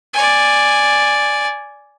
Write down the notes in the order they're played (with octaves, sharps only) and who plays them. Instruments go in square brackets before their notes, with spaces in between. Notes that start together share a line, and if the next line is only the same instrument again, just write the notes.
[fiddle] D5 G#5